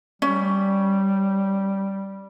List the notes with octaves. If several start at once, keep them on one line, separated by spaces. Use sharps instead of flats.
G3 C#4